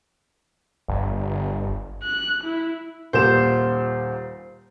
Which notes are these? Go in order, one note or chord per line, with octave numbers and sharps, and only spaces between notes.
G1
F#6
E4
D#1 A#2 C5 E7